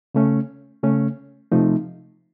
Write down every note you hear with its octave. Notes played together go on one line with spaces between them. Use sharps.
C#3 A3 C#4
C#3 A3 C#4
C3 F3 A3 D#4